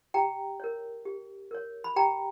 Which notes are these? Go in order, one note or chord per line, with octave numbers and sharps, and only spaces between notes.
G4 G5 A#5
A#4 C#5
G4
A#4 C#5
B5
G4 G5 A#5